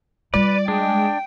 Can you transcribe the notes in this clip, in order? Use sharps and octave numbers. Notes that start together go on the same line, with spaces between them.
G3 F4 B4 D5
G#3 D4 G5